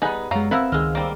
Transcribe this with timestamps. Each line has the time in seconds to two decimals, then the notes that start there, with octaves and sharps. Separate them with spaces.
0.02 G3 B3 D#4 G#4 B4
0.31 F#2 F#3 G#3 F5 A#5
0.51 B3 C4 E4 A#4 C5 F5 B5 E6
0.72 C#2 D#3 G#3 D#5 F6
0.95 G3 A#3